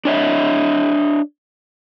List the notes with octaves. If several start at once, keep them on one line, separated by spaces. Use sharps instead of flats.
D4 C#5 D#5 E5